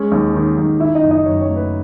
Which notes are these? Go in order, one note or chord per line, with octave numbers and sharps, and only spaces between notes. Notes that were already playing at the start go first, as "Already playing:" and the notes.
Already playing: G#3 C#4
D#2
D#3
D#2
D#3 E4 E5
D#4 D#5
F#1
D#4 D#5
F#2 C#5
C#5
A3
B4